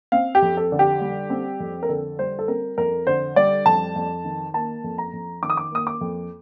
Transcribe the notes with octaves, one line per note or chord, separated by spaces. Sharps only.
C4 F5
G4
F2
A4
D3
G4
G3
C4
F2
A#4
D3 A4
G3 C5
A4
C4 A#4
F2 A#4
D3 C5
G3 D5
F2 A5
F2
D#3
A#3 A5
F2
A#5
F2
D#3 D6
D#6
D6
A#3 D#6
D6
F2